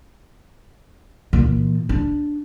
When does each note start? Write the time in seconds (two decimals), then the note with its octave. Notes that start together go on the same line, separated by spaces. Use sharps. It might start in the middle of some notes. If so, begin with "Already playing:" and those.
1.33 A#2 E3
1.89 D4